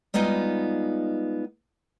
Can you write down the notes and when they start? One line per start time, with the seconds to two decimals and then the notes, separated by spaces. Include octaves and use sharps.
0.14 G3 G#3 B3 D#4 F4